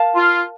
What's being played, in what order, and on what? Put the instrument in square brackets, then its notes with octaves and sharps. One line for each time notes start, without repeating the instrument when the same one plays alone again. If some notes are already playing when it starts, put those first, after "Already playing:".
Already playing: [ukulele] A#4 F5 A5
[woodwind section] F4